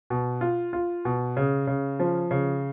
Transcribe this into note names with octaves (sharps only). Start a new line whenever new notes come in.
B2
F4
F4
B2
C#3
C#3
F3
C#3